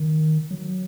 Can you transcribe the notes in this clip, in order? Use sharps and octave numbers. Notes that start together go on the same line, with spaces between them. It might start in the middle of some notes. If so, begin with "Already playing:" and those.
Already playing: D#3
F#3